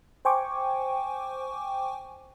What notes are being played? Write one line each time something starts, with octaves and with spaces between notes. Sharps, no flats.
C5 G5 G#5 C#6 D6